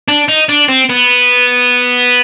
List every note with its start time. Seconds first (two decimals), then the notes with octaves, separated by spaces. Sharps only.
0.08 D4
0.28 D#4
0.49 D4
0.68 C4
0.89 B3